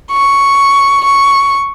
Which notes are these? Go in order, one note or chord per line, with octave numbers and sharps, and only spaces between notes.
C#6
C#6